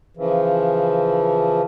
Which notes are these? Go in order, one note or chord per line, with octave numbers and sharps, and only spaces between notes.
C#3 E3 F3